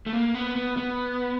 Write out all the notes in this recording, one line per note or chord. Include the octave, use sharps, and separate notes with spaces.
A3
A#3
B3
B3
B3